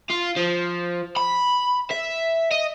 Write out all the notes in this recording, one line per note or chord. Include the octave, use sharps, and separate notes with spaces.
F4
F3
B5
E5
D#5